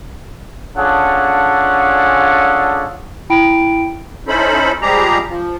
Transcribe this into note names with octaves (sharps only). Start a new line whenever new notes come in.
C#4 D4 F4 G#4 A4 F#5
E4 G5 B5 D7
C#4 D#4 E4 A4 C5 B5
F3 G3 G#3 G4 G#4 A#5
F3